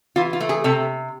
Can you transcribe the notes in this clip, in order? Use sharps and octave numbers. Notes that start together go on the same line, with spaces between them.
E3 F4
F4
A3
G#4
C3 A4